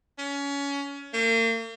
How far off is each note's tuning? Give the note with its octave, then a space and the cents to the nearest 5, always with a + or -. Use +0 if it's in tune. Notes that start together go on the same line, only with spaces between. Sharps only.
C#4 +25
A#3 -40